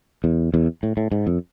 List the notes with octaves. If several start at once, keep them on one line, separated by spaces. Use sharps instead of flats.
E2
E2
A2
A2
G#2
F2